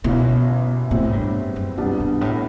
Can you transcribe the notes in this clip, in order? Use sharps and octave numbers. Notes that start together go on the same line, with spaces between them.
G1 F#2 B2 E3
E2 A2 C3 F#3 C4 E4
G2
F#2
C2 F#2 B2 G3 B3 D4
G2
A2